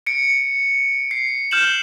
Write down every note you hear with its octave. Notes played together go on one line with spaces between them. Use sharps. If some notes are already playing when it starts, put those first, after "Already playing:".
C#7 D7
C7
F6 G6 E7 F#7